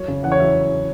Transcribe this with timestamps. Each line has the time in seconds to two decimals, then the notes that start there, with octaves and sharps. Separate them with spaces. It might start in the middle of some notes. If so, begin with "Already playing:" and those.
Already playing: F#3 C#5
0.08 C#3
0.23 E2 F#5
0.32 C#5
0.40 F#3 E5